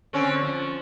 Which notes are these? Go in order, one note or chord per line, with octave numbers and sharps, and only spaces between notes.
D3 C4 C#4
F3